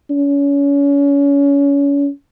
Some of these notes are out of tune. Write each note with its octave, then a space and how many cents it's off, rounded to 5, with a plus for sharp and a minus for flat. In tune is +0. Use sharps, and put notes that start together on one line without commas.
C#4 +30